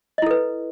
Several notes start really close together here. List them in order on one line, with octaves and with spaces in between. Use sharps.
D#5 E4 A4 B4